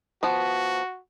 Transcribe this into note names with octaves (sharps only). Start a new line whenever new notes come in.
F3 B3 F#4